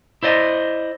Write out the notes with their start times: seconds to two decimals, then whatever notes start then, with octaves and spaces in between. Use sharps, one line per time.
0.23 E4 C5 D5 D#5